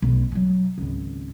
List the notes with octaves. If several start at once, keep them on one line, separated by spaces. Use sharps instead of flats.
B1
F#3 G3
G#1 C#2